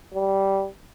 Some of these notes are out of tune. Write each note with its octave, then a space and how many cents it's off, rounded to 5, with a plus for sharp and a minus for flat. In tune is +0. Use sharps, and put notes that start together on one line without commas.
G3 -10